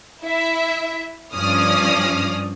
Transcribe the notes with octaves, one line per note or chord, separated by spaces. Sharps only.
E4 E5
G2 F3 C#4 D5 D#6 F6